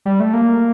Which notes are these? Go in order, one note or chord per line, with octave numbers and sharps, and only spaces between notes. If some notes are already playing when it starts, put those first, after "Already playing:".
G3
A3
A#3